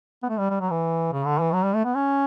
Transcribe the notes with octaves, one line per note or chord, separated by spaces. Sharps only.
B3
A3
G3
G3
F#3
E3
C#3
D3
E3
F#3
G3
A3
B3
C#4